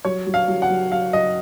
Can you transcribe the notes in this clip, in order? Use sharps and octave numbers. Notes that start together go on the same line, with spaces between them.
F#3 C#5
F#3
F5
F#3
F#5
F#3
F#3 F5
F#3 D#5